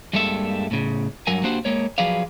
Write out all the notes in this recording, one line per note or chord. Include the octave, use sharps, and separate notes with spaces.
G2 G3 G#3 A#3 A4 E5
A2 C#3
G2 F#3 A#4 G#5
A#3 D4 F#4 G4 C5 F#5
G#3 A#3 C#5
F3 F#3 G#4 B4 D5 F5